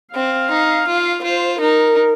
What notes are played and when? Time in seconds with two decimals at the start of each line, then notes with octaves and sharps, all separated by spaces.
0.15 C4 F5
0.50 D#4
0.88 F4
1.23 F4 C5
1.59 D#4 A#4